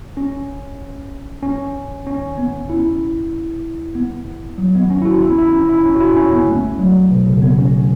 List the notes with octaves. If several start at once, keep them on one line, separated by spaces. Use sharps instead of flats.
C#4
C#4
C#4
B3
E4
B3
F#3
B3
C#4
E4
F#4
E4
E4
C#4
E4
C#4
F#4
E4
C#4
B3
A3
F#3
B2
C#3
B3
C#4